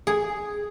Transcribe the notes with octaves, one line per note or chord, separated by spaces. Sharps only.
G#4